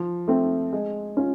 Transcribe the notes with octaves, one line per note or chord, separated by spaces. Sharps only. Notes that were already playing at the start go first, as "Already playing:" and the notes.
Already playing: F3
A3 C4
G#3
C#4 F4